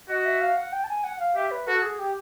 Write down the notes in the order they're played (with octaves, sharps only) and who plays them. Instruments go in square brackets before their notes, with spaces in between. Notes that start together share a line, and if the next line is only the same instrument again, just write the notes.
[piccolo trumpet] F#4 [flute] D#5
[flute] E5
F5
F#5
G5
A5
G#5
F#5
F5
[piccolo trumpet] G4 [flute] E5
[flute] B4
[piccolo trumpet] F#4 [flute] A4
[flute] G#4
G4